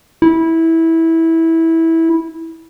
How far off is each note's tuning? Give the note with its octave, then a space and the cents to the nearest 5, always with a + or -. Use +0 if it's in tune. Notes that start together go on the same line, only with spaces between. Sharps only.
E4 -15